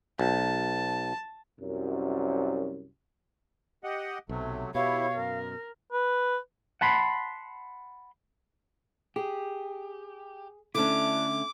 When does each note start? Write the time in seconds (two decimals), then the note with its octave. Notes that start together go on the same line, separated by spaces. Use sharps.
0.19 B1 A5
1.60 C2 F#2
3.84 G4 D#5 F#5
4.29 B1 C3 F#3 A3
4.75 B2 E4 G4 C#5 F5
5.15 F#2 A#4
5.92 B4
6.81 F#5 A5 B5 C6
9.16 G4 G#4
10.75 D3 A3 C#4 D4 E4 D6